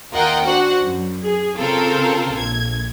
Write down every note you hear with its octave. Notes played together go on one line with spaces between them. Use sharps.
D#2 F4 A#4 D#5 F#5 G5
D4 F#4 C5 F#5
F#2
G#4
C#3 C4 F4 A4 A#4
A#1 G#6